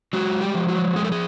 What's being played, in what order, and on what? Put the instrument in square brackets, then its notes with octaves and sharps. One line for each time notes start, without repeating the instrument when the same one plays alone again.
[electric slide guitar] F#3 G#3 F#4
G3 G4
F3
F#3 F#4
G#3 G#4
A4
G#4